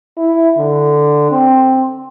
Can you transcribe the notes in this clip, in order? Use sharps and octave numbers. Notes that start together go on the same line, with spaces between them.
E4
D3
C4